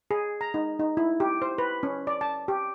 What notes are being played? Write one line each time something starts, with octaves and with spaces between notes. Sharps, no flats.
G#4
A#5
D#4
D#4
E4
G4
C5
B4
C#4
D5
A5
G4